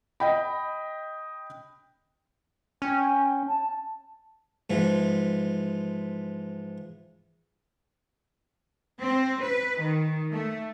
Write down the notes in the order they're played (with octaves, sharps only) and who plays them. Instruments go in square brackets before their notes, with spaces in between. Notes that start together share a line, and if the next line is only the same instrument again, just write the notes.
[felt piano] D#5 G5 B5
[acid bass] C#4 [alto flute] G5
[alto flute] A5
[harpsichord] G#2 E3 F3
[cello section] C4
B4
D#3
A3